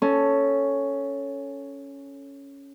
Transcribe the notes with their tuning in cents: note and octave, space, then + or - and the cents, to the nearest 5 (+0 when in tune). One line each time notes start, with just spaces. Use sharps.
C#4 +5 A4 +0